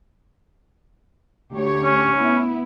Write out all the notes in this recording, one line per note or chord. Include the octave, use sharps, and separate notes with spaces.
D2 G4 C#5
C#4
B3 E4